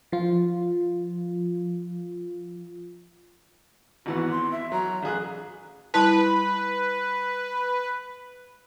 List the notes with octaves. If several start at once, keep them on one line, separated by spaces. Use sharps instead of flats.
F3 F4
G#1 E3 B3 F#4
C6
E5
F#3 A#5
A1 G#4 F#6
G3 E4 B4 A5